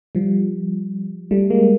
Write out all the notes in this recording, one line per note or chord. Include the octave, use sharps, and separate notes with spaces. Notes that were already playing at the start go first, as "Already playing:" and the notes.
F3 G3
G3 A3
G#3 A#3